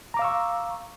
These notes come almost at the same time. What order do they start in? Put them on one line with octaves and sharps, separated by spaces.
A#5 D6 F5 E6 C#6